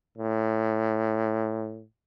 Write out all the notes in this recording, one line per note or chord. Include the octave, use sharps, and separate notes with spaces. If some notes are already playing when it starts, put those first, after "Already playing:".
A2